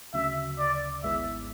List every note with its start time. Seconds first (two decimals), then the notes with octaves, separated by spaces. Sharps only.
0.13 D2 C#3 F#3 E5
0.58 D5
1.03 G#1 G#2 G#3 B3 E4 E5